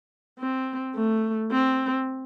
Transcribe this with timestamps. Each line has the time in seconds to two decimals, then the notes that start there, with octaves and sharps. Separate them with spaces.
0.39 C4
0.95 A3
1.52 C4